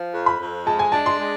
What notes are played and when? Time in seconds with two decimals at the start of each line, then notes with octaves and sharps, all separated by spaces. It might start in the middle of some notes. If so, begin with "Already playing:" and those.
Already playing: F3
0.13 F2
0.26 B5
0.40 F2
0.67 G#3 A5
0.79 G#5
0.92 D4 A5
1.06 C6
1.20 G#3